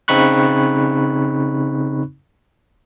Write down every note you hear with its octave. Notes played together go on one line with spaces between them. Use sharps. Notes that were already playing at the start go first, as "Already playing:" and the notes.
C#3 C4 D#4 B5 C#6 F#6